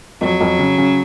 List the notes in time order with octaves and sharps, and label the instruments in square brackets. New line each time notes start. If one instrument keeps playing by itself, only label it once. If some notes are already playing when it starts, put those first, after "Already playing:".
[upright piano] F2 [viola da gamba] F#3
[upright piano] F2
C#3
C#3